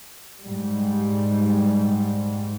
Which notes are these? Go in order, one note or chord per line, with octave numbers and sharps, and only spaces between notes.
G#2 G3